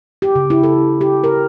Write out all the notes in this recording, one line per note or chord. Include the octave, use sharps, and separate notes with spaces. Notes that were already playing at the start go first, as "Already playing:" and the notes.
G4
C#3
E4
A4
G4
A#4